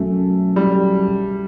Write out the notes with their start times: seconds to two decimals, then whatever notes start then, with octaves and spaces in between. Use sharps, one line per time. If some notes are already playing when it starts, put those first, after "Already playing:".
Already playing: B1 B2 F#3 A3 C#4 F#4
0.56 G3